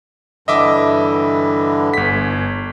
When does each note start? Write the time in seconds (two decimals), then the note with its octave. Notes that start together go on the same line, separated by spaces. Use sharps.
0.48 G2 D3 E3 D#5 E5 D6
1.94 G1 B6